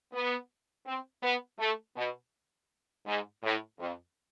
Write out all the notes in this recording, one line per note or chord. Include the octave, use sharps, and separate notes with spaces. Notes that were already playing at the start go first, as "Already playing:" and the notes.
B3
C4
B3
A3
B2
G#2
A2
F2